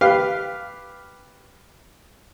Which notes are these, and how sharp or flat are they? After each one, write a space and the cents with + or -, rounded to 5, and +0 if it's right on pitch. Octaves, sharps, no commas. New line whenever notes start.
G4 +0 B4 +0 F5 +0